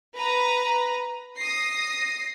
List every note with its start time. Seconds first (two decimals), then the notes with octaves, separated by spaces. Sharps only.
0.16 B4 A#5
1.38 D#6 A#6 C7